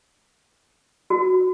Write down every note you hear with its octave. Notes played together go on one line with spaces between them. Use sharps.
F#4